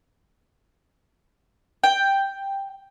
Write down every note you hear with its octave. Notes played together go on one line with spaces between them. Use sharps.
G5